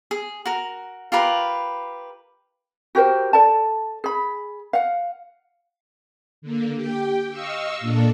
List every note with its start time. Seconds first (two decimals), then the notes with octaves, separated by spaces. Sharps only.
0.11 G#4
0.45 F#4 A#4
1.12 F4 G4 A#4 B4
2.95 F#4 G4 A#4 C5
3.33 A4 D5 A5
4.04 G#4 B5
4.73 F5 F#5
6.42 D3 A#3
6.76 G4 G5
7.30 D#5 F5 C#6 E6
7.80 A#2 A#3 D4 A4